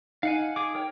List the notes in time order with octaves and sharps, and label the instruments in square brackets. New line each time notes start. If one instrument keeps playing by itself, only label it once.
[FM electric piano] D#4 [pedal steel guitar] F5 F#5 G#5
[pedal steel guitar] G#4 D6
A#4 C#5 G5